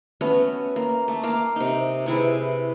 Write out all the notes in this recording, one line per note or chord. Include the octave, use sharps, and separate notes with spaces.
A3 B3 C#4 F#4
A#3
A3
A#3 F5 D6
C3 D#4
C3 E4 G#4 B4